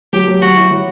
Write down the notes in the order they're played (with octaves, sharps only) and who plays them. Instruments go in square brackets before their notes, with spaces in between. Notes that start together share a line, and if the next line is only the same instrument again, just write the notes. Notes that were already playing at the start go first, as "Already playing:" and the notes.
[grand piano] F#3 [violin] G4
[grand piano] F#3
[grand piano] F#3 [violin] F#4
[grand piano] E4
F#3